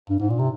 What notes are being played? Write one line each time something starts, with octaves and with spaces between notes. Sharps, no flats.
G2
G#2
A#2
C3